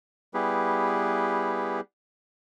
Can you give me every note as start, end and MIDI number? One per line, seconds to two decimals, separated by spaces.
0.34 1.81 55
0.34 1.81 59
0.34 1.81 64
0.34 1.81 67
0.34 1.81 68
0.34 1.81 71